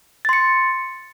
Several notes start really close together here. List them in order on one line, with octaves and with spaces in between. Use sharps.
A6 C6 C#7